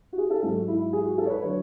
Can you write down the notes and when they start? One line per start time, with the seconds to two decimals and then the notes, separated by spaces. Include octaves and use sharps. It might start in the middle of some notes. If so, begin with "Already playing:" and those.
0.13 F#4
0.18 G#4
0.30 A4
0.43 G#2 F#3 A4
0.55 F#4
0.68 E4
0.80 E4
0.93 G#4
1.05 F#4
1.18 A4
1.25 C#5
1.30 B4
1.42 D3 F#3 C#5